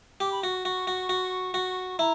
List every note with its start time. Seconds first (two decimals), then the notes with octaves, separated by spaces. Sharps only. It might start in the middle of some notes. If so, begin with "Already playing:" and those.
0.20 G4 D6
0.32 B5
0.43 F#4 C#6
0.65 F#4 C#6
0.87 F#4
1.09 F#4
1.54 F#4
1.99 E4 A#5